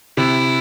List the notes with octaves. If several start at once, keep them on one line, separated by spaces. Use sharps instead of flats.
C3 E4